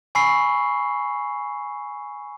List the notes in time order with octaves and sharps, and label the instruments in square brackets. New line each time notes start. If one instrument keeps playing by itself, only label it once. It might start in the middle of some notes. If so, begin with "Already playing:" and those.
[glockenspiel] G#5 B5 C#6 E6 C7